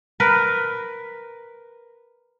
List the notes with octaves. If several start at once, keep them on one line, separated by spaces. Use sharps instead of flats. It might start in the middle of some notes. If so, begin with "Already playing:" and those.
A#4 B4